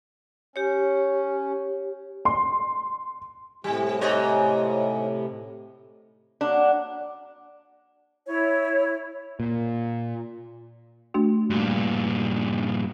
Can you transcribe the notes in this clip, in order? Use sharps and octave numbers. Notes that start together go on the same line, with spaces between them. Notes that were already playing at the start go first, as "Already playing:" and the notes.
C#4 G4 C#5
C6
A2 C3 G3
G#2 C#5 D#5
F#3 A#3 D4 F#4
E4 C#5
A#2
A3 D4 F#4
G2 A#2